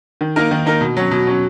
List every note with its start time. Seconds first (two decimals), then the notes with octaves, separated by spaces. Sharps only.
0.21 D#3
0.36 A#3 D#4 A#4
0.51 D#3
0.66 A#3 D#4 A#4
0.81 B2
0.97 F#3 C#4
1.11 B2
1.27 F#3 C#4